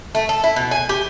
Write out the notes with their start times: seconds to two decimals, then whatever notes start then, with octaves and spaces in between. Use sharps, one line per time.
0.15 A3
0.29 A4
0.44 E4
0.56 B2
0.71 G#5
0.89 G4